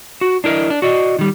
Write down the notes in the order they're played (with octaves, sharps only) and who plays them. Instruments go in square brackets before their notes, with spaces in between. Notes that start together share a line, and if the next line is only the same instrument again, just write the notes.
[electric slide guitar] F#4
D4 E4 A#4 D#5
D4
F#4 D5 D#5
D#3 G3